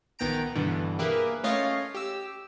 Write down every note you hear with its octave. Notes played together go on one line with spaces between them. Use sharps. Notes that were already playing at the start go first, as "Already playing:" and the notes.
A#1 D#3 B3 G5 A#5 D7
G2 B2 D3 E3
A#3 G4 G#4 A#4 B4 E5
A3 C#4 F4 C#5 D#5 F5
G4 E6